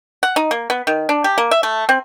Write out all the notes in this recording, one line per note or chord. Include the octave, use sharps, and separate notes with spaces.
F#5
D#4
A#3
B3
D#3
D4
G4
A#3
E5
A3
C4